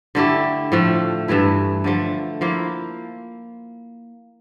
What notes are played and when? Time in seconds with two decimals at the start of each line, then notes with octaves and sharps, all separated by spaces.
0.15 D3 A3 E4 G4
0.72 A2 F3 A3
1.28 G2 E3 A3 E4
1.84 D3 F3 A3
2.41 F3 A#3 E4